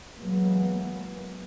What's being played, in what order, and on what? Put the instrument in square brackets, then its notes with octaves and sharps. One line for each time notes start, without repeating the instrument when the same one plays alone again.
[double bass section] E3 F#3 G#3 A#3 B3